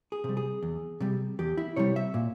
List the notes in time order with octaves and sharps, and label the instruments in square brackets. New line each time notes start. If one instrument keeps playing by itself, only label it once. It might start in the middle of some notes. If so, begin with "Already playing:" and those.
[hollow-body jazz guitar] G#4
C3 G3
G#4
E2
C3 G3
E2 G4
E4
C3 G3 C#5
E5
A#2